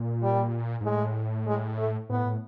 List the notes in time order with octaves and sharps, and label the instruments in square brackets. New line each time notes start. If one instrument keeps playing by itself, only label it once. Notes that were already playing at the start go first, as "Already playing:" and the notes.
Already playing: [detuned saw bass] A#2
[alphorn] G3
[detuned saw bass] G#2
[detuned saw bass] A2 [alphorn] G#3
[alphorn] G#3
A3
[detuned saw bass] A2 [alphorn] B3
[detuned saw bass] A2